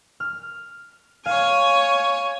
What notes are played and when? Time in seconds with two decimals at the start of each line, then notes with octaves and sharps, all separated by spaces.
0.20 F6
1.26 C#5 F5 G#5